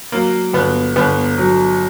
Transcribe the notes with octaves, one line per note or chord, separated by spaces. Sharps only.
F#3 A#3
G1 B3
G1 B3
F#3